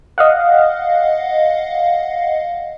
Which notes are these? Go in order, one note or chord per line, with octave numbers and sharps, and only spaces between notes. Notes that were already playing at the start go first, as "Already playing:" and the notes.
D#5 F5 F#5